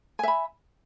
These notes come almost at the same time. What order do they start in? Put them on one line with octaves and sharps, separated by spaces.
G#5 E5 B5